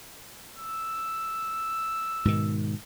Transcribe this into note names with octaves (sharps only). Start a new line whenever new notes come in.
E6
G#2 B2 D#3